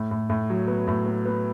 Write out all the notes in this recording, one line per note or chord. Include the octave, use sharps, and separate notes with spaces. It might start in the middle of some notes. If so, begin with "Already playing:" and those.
Already playing: A2
A2
A2
F#3
B3
A2
B3
B3